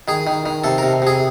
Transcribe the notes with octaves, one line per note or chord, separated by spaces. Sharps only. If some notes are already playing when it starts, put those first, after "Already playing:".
D#3 G#4
D#3
D#3
C3 A4
C3 A#4
C3 G#4